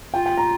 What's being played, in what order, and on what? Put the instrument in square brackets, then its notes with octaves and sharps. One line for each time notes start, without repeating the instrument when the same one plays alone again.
[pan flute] F4 [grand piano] G5
[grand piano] G5
A#5